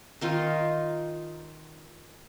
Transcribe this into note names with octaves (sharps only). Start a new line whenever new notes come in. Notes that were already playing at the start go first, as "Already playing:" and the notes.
D#3 D#4 F4